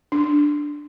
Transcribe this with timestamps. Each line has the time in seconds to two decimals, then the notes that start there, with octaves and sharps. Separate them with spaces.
0.12 D4